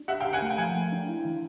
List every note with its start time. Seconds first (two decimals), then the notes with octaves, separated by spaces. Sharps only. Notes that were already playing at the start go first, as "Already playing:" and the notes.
Already playing: D4
0.08 G4 E5 F#5
0.21 F5 G5
0.25 G4
0.33 F#5 G#5
0.42 A3
0.50 G5
0.58 F3 F#5 G#5
0.75 A3
0.92 D4
1.08 E4
1.25 E3